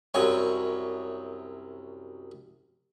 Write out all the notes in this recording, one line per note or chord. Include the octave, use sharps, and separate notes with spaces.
C2 F#2 C#5 G#5 C#6